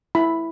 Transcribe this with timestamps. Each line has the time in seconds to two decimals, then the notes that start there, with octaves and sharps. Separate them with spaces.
0.15 E4 B5